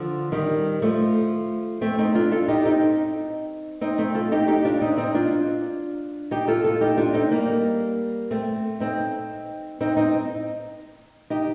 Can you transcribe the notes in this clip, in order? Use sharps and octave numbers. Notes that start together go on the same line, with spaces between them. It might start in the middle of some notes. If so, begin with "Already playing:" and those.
Already playing: D3 F3
D#3 G3
F3 A3
A3 C4
C4 D#4
D4 F4
F4 A4
D#4 G4
C4 D#4
C4 D#4
A3 C4
F4 A4
D#4 G4
D#4 G4
D4 F4
C4 D#4
C4 D#4
D4 F4
D#4 G4
F4 A4
F4 A4
D#4 G4
D4 F4
C4 D#4
G3 A#3
A3 C4
C4 D#4
C4 D#4
C4 D#4
D#4 G4